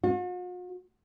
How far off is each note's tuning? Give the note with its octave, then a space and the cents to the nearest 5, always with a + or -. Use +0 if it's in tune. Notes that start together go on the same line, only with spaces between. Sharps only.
F#4 -45